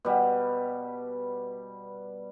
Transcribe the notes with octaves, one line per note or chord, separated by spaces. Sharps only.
B2 G3